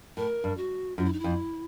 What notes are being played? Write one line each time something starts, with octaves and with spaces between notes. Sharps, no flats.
A2 A#4
G2
F#4
F#2 F4
E4
D#4
F2 E4